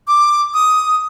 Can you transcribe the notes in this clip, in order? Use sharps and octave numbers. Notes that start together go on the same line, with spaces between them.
D6
D#6